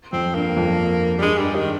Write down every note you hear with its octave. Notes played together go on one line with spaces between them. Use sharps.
F2 C4
G2 A#3
F2
G3
G2 G#3
G2 G3
D#3